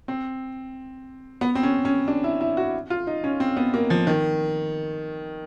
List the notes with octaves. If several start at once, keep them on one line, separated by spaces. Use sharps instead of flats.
C4
B3
C4
C#4
C#4
D4
E4
E4
F#4
F4
D#4
C#4
C4
B3
A#3
F3
D#3